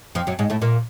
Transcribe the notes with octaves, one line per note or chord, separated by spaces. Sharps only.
F2 F3
F#2 F#3
G#2 G#3
A2 A3
A#2 A#3